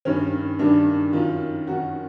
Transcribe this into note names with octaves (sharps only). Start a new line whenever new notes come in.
G2 D#3 C#4
G2 D#3 D4
F#2 D#3 F4
F#2 D#3 F#4